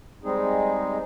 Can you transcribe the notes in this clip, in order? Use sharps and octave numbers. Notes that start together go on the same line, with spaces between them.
G3 G#3 C4 D#4 G#4